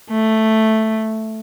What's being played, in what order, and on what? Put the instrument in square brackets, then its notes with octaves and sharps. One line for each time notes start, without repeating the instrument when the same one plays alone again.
[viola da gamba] A3